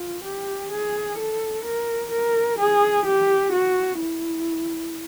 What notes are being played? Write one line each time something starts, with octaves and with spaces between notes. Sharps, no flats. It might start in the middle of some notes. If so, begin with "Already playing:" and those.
Already playing: F4
G4
G#4
A4
A#4
A#4
G#4
G4
F#4
E4